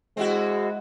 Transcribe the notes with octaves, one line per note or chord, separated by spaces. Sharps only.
G#3 C4 E4 F#4